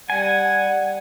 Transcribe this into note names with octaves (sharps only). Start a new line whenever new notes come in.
G3 F#5 G#5